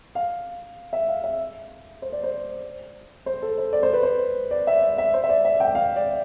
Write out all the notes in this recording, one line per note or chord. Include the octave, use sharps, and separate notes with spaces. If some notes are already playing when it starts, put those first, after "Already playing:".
F5
E5
F5
E5
C5
D5
C5
C5
A4
C5
D5
C5
B4
C5
D5
E5
D5
E5
C5
E5
D5
E5
G5
F5
D5